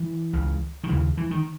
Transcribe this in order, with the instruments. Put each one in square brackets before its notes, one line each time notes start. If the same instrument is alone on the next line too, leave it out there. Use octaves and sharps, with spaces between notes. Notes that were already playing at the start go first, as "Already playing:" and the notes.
Already playing: [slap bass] E3
C#2 C#3
D#3
D#2 C#3 E3
E3
D#3